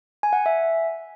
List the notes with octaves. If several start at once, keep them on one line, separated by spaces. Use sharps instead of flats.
G#5
F#5
E5